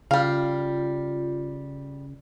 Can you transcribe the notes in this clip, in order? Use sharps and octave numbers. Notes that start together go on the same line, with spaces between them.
C#3 G3 F4 F5